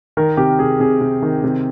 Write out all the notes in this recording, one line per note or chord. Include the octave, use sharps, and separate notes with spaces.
D#3 A#4
C3 G4
C3 G#4
C3 G#4
C3
D#3
C3